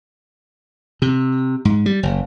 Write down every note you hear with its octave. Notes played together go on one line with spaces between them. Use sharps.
C3
G#2
G3
F#1